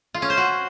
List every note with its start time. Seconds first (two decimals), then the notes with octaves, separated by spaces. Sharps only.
0.14 F4
0.22 C#4
0.30 C5
0.37 F#4